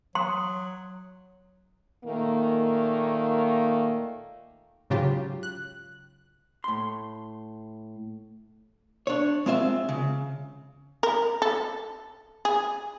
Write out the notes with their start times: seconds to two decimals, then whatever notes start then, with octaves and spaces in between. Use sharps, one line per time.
0.15 F#3 A#5 C6 D#6
2.05 A#2 D#3 A3 A#3
4.90 G#2 C#3 F#3 F4 G4
5.43 F#6
6.64 A2 C6
9.07 D4 C#5
9.46 G#3 C4 F4 E5
9.89 C#3
11.03 A#4
11.42 A4
12.45 G#4